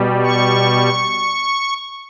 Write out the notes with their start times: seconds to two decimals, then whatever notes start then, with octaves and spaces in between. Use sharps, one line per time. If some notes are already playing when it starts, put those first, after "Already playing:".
Already playing: B2 G3
0.23 C#6